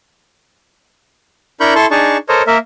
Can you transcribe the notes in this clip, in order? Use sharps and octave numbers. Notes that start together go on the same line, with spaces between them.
D4 E4 A#4 B5 C#6 G6
E4 A4 A5 C6 C#6
D4 D#4 G#4 A5 C#6
A4 A#4 C5 C#5 D#5
A#3 A#4 E5